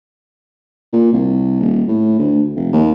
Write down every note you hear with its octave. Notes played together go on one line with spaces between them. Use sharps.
A#2
C2
D#1
A2
D2
F1
D#2